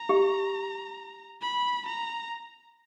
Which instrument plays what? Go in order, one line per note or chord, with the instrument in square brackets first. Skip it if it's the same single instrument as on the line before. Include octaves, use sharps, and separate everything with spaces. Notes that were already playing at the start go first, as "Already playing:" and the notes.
Already playing: [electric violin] A#5
[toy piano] G4
[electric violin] B5
A#5